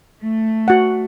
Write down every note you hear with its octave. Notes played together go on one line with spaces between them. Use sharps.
A3
F#4 F#5